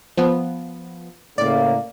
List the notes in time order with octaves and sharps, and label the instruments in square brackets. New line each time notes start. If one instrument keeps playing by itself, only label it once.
[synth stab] F3 B3
[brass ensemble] A2 C#3 A#3 [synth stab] D5